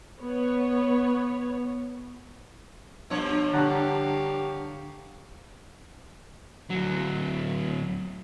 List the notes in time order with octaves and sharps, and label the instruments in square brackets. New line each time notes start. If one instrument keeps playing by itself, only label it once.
[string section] B3 C#5
[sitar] G2 F3 C#5 [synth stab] B2
[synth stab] D3 D4 [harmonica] G4 F5 C#6 [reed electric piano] F#5 A5 A#5
[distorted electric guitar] D2 F#3